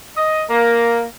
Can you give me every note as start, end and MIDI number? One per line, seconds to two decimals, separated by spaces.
0.16 0.43 75
0.49 1.04 58